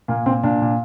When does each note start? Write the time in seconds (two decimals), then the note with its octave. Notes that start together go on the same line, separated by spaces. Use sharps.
0.08 A#2 A#3
0.26 A#2 C4
0.43 A#2 D4
0.62 A#2